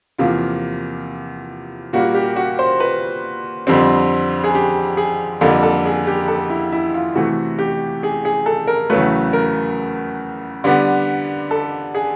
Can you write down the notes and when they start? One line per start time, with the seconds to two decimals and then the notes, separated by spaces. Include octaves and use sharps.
0.18 E2 C3 F3 A#3 F4
1.93 A#2 G3 A#3 F#4
2.15 G4
2.36 F#4
2.59 C5
2.80 B4
3.67 F2 D3 G3 C4
4.44 G#4
4.55 G4
4.97 G#4
5.41 F2 D3 G3 A#3 A4
5.63 A4
5.86 G#4
6.07 G4
6.28 A4
6.50 E4
6.72 E4
6.94 F4
7.15 C3 E3 A3 F#4
7.59 G4
8.03 G#4
8.25 G#4
8.46 A4
8.67 A#4
8.90 E2 C#3 F#3 A3 B4
9.33 A#4
10.64 D3 G3 B3 D4
11.51 A4
11.95 G#4